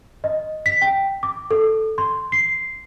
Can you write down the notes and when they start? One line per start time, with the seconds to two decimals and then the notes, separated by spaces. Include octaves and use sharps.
0.24 D#5
0.66 B6
0.82 G5
1.23 D6
1.51 A4
1.98 C6
2.32 C7